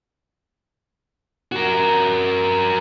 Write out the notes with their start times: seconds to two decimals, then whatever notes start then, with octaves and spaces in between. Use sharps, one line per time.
1.52 F#4 A#4